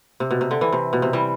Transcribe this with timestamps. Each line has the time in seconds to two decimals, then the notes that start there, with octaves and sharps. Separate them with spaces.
0.20 C3
0.31 B2
0.41 C3
0.51 D3
0.61 E3
0.73 C3
0.93 B2
1.02 C3
1.13 E3 G3